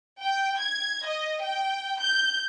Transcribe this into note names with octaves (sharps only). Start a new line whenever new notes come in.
G5
G#6
D#5
G5
G6